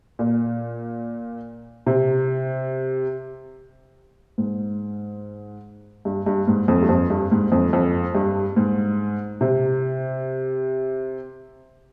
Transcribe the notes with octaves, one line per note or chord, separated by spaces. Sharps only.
A#2
C3
G#2
G2
G2
G#2
F2
G2
F2
G2
G#2
F2
F2
G2
G#2
C3